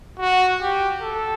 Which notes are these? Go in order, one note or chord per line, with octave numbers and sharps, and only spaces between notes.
F#4
G4
A4